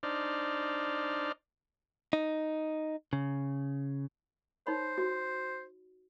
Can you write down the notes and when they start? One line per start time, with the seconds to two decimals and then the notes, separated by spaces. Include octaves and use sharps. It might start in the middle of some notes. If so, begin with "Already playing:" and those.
0.03 D4 D#4 C5 D5 F6
2.13 D#4
3.13 C#3
4.67 D#4 C5 C#5 B5
4.98 F#4